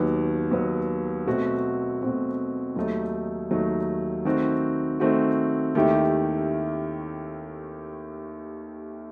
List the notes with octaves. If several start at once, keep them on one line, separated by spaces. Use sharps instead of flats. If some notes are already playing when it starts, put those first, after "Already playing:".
Already playing: D#2 D#3 F#3 B3
D#2 D#3 F#3 B3
B2 A3 C4 F#4
B2 A3 C4 F#4
D#2 D#3 F#3 A3 D#4
D#2 D#3 F#3 A3 D#4
D#3 A3 C4 F#4
D#3 A3 C4 F#4
D#2 D#3 A3 E4 G4